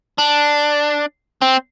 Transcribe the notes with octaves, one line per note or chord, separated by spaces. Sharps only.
D4
C4